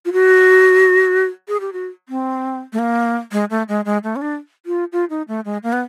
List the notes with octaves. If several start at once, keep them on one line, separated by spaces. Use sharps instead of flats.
F4
F#4
G#4
G4
F#4
C4
A3
A#3
G#3
A3
G#3
G#3
A3
C#4
D4
F4
F4
D#4
A3
G#3
A#3
B3